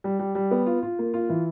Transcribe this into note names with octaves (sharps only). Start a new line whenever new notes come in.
G3
G3
G3
B3
F4
F4
A#3
F4
E3